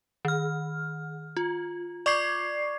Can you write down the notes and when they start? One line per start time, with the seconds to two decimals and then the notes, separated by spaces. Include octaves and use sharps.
0.25 D#3 F6
1.37 F4
2.06 D5 C#6 D6 G#6 C7